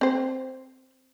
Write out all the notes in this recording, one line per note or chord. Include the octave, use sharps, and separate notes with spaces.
C4 C5